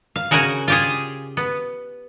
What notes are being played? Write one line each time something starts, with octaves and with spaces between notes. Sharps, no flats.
F5
C#3 F#4 A#4 F#5 G#5
F4 G4 G#4
B3